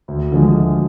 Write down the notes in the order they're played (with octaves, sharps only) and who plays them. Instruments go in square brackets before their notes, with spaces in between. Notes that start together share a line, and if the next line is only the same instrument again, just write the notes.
[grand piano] D2
D3 F3 G#3
D2